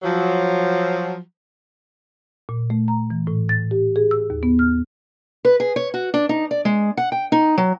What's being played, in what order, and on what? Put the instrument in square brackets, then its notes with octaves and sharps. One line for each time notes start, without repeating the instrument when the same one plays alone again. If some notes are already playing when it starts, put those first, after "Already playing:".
[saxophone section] F3 F#3
[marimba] A#2
A3
A#5
E3
A2
A6
G4
G#4
E6
D#2
B3
F6
[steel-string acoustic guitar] B4
G#4
C#5
F#4
D4
D#4
D5
G#3
F#5
G5
D#4
F#3